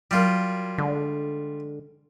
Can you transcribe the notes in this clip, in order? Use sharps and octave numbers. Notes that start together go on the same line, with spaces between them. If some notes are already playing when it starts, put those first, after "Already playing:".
F#3 G3 F4 A#4
D3 G#3